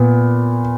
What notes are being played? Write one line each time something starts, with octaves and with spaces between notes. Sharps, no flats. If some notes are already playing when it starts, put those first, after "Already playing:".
Already playing: A#2 B3